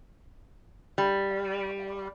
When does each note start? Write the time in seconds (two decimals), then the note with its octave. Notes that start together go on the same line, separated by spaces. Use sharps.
0.98 G3